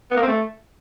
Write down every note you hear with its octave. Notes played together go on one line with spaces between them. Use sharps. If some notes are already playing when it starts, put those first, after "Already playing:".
B3
A#3
C4
A3